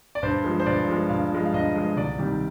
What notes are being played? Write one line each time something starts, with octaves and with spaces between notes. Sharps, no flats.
D5
G2 C5
F3 G#3
C5
G2 D5
F3 G#3
G2 F5
F3 G#3
F5
G2 D#5
F3 G#3
C2 D5
C3 D#3 G3